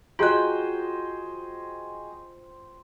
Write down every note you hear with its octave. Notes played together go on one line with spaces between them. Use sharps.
F4 F#4 G#4 C5 D#5 G5 F#6